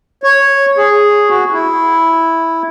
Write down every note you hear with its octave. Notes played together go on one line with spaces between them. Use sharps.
C#5
G#4
F#4
E4